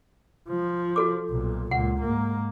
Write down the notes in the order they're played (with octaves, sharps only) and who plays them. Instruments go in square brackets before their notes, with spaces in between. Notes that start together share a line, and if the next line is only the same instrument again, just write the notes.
[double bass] F3
[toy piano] F#4 A4 D6
[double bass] B1 A#2
[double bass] C#2 A#2 [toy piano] F#5
[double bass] G#2 A#3